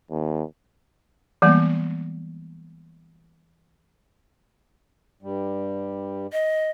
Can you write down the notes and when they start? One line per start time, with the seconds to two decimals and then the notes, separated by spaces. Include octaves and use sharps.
0.11 D#2
1.42 E3 G3 G#3 A#3 B3
5.23 G2 G3
6.32 D#5